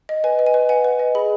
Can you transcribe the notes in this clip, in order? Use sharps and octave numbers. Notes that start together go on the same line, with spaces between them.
D#5
B4 G#5
D#5
G#5
B4
F#5 G#5
B4
D#5
G#4 B5